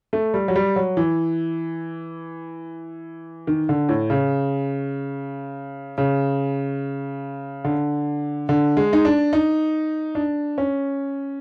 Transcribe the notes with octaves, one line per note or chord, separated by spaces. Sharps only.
A3
G3
F#3
G3
F#3
E3
D#3
D3
A2
C#3
C#3
D3
D3
G#3
D#4
D4
D#4
D4
C#4